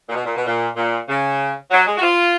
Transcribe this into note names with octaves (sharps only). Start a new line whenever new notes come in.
A#2
B2
A#2
B2
A#2
A#2
C#3
F#3
G#3
F#4
F4